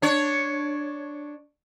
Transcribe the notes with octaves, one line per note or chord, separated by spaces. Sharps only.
D4 C#5